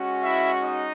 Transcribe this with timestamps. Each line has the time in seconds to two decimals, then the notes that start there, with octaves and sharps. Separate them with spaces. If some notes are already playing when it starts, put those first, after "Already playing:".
Already playing: G#3 C#4 F#4
0.23 E4 E5
0.62 D#4 D#5